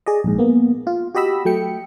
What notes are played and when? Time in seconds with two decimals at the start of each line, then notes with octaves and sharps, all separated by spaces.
0.06 G#4 D5 D#5
0.24 A#1 G#2
0.38 A#3 B3
0.87 F4
1.15 F#4 G4 D#5 B5 E6
1.45 F#3 A3 G5 C#7